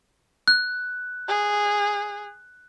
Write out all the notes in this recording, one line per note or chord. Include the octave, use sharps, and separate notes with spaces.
F#6
G#4